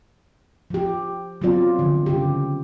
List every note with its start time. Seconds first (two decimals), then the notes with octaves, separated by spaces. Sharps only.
0.70 F3 G4
1.41 F#3 B3 C4 F4 D5
1.79 D3 F3
2.06 C#3 G4